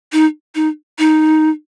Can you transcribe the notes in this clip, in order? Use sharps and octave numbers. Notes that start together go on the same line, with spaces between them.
D#4
D#4
D#4